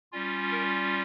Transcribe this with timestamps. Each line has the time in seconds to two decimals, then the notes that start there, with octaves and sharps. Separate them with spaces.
0.12 G3 C#4 F4
0.51 A#4